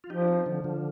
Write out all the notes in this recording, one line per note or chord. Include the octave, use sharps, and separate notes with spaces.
F4
F3 D#4 G4
D4
C4 D#4
D3 F3
D3 F3